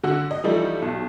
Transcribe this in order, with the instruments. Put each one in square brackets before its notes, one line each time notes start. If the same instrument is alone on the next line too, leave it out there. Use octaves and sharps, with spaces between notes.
[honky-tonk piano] D3 F#4 E6
D#5
E3 F3 G3 A3 D#4 E4
B1